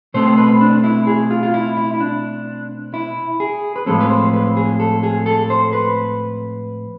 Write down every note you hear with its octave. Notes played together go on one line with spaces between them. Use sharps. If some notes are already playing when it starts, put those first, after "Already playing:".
B2 A3 C4 C5
B4
D4
E4
G#4
F4
F4
E4
E4
E4
D4
E4
G#4
B4
A2 F3 G#3 C4 A4
B4
C5
B4
G#4
A4
G#4
A4
C5
B4